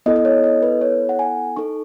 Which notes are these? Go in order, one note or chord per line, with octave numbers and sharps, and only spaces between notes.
B3 E4 A4 D#5
D#5
C#5
D#5
B4
C#5
F#5
G#5
D#4 A4 C#6